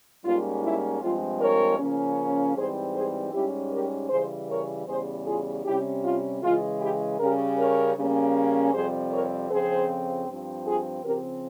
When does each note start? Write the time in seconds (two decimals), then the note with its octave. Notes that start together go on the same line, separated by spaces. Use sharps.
0.24 G#2 G3 A#3 C#4 F4
0.63 E4
1.01 G2 F3 G#3 C4 F4
1.39 A#4 C#5
1.78 C#3 F3 A#3 C#4
2.55 G#2 E3 G3 C4 G#4 C5
2.94 G#4 C5
3.33 G#2 G3 C#4 E4 G4
3.72 G4 A#4
4.10 C#3 E3 G3 G#4 C5
4.49 A#4 C#5
4.87 E2 C#3 G3 G#4 C5
5.25 F4 G#4
5.64 C3 G3 C#4 E4 G4
6.03 F4
6.42 C#3 E3 G#3 F4
6.80 E4 G4
7.18 C#3 G3 C#4 G4 A#4
7.57 A#4 C#5
7.96 C#3 G3 A#3 C#4
8.73 F2 C3 G3 C4 G#4 C5
9.11 A#4 C#5
9.50 F2 C#3 F3 C4 G#4 C5
10.27 G2 F3 C4
10.66 F4 G#4
11.04 C#3 F3 C4 G4 A#4